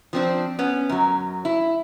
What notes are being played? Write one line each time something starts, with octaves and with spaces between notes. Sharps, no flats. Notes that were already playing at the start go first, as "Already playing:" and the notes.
F3 C4 D4
B3 C#4
F#2 F#3
E4